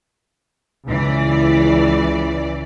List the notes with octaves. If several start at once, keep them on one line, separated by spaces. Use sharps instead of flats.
C#2 E3 D5